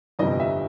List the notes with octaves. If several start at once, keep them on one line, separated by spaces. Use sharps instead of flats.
G1 F2 C3 E3 G3 D#5
E5